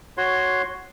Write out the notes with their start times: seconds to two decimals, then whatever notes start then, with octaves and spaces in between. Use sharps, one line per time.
0.17 F#4 C#5 C6